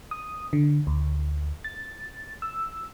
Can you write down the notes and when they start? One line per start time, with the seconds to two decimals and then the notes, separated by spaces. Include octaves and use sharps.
0.11 D#6
0.53 D3
0.87 D2
1.64 A6
2.42 E6